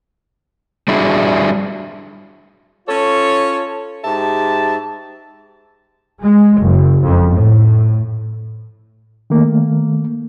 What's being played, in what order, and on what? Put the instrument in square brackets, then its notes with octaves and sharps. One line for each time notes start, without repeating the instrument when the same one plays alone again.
[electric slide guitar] G3 D4 E4 F#4 G#4
[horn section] C#4 F4 A4 C#5
G#2 G4 E5 A5
[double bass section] G#3
F#1
F2
A2
[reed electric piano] D#3 A3 A#3